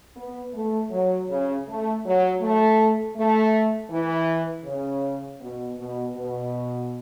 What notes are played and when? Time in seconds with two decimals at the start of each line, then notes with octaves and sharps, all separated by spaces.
0.16 B3
0.53 A3
0.91 F#3
1.29 C#3
1.67 A3
2.04 F#3
2.40 A3
3.16 A3
3.90 E3
4.65 C#3
5.40 B2
5.78 B2
6.15 B2